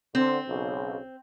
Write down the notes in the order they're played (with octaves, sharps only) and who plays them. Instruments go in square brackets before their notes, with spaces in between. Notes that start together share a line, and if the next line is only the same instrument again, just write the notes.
[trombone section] D3 C5 [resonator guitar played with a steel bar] C4
[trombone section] B1 C#3